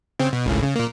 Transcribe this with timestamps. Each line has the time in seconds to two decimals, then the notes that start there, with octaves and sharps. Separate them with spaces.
0.19 C#3 C4
0.33 B2
0.46 G#1 C#2 A2
0.63 C#3
0.76 A#2 A#3